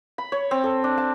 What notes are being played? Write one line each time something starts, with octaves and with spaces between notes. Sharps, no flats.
B5
C#5
C4
A4
D4
A5